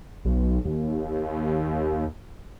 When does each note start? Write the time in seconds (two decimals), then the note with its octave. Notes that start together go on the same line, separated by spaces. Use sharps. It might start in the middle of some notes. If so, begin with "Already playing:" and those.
0.25 B1
0.65 D#2